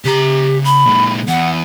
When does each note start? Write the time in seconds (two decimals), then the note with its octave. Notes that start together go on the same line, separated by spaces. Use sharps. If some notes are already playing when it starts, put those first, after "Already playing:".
0.05 C#3 G4 A#5
0.64 B5
0.86 A#2 G#3
1.28 E2 F#5